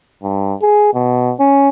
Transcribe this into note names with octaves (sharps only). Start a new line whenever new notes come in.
G2
G#4
B2
C#4